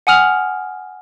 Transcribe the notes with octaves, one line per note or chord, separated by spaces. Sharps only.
F#5 G#5 D#6 F6 F7 F#7